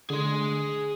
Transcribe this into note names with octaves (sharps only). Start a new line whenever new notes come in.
D3 D4 G#4 C6